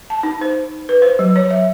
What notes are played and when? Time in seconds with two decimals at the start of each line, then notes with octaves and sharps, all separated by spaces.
0.10 A5
0.23 D#4
0.41 C5
0.89 B4
1.02 C5
1.19 F#3
1.36 C#5
1.51 E5